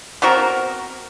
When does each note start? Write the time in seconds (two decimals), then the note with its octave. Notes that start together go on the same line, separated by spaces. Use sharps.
0.22 B3 C4 F#4 A#4